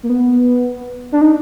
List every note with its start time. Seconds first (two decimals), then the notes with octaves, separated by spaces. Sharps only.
0.03 A#3
0.09 B3
1.12 D4
1.21 D#4